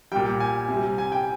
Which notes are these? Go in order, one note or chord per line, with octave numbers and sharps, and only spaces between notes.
A#2 G3 G5
G#5
C3
G3
G#5
G5